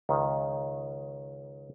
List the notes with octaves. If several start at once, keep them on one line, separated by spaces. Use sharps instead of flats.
C#2 D#3